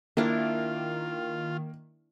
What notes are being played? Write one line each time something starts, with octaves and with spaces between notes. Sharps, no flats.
D#3 A#3 D4 E4 F4